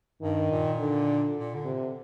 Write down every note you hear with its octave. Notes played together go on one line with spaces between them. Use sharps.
G2 D#3
A#2
D3
A#2
D3
C3